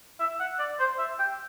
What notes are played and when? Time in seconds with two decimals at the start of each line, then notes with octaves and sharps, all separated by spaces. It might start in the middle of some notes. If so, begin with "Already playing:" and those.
0.20 E5
0.40 F#5
0.59 D5
0.79 C5
0.99 E5
1.19 G5